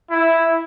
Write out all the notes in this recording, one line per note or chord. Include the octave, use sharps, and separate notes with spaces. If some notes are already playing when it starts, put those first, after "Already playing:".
E4